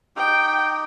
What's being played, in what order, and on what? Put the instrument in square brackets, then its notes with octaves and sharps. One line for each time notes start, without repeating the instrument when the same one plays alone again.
[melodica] D#4 G4 [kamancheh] G5